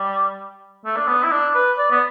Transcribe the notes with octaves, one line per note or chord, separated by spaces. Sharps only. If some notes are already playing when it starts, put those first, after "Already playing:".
Already playing: G3
A3
D4
B3
E4
D4
B4
D5
B3